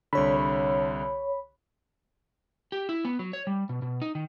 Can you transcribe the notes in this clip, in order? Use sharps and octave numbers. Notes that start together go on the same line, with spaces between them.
C2 D3 C#5 B5
G4
E4
B3
F#3
C#5
G3
B2
B2
D#4
D#3